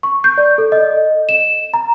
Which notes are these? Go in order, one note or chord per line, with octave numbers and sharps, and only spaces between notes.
C#6
G6
D5
A4
D#5
E7
A#5